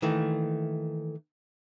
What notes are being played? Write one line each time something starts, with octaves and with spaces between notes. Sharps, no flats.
D#3 E3 A3 A#3